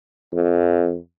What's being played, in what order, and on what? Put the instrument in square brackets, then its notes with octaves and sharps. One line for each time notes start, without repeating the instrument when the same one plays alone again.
[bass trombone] F2